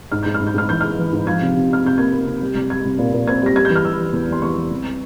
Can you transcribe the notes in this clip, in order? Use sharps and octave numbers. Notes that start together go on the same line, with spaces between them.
G#2 F6
G#2 G6
F6
G#2
G6
G#2 F6
E3 G6
G#3 F6
E3
G#2
F3 G#6
C3
C3
C3 F6
C3 G6
A#3 G#6
A#3
C3
G3
C2
G3 G#6
C2
A#2
A#2
C4 G#6
G3 A#6
G3 G#6
G6
E3
F6
G3 E6
E3
E2
G3 C6
E2 C#6
E3
C2